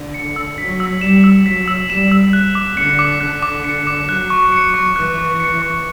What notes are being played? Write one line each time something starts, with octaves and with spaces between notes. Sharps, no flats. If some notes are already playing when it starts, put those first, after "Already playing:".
Already playing: D3
C#7
E6
F#3 B6
E6
G3 E7
E6
F#3 B6
E6
G3 E7
E6
F#6
D6
D3 C#7
D6
D3 F#6
D6
C#7
D6
F#3 F#6
C#6
C#7
C#6
E3 F#6
C#6
C#7
C#6